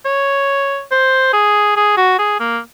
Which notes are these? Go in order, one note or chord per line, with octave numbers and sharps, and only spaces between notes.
C#5
C5
G#4
G#4
F#4
G#4
A#3